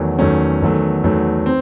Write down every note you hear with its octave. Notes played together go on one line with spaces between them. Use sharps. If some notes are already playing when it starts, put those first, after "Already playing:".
Already playing: E2 D#3 F#3 A3
E2 D#3 F#3 A3 C#4
E2 D#3 F#3 A3
E2 D#3 F#3 A3
C4